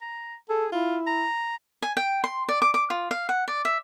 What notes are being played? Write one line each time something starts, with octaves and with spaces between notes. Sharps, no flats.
A#5
G#4 A4
E4 F4
A#5
G#5
G5
C6
D5
D6
D6
F4
F5
F#5
D5
E5